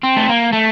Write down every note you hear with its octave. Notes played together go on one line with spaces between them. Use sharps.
C4
A3
A#3
A3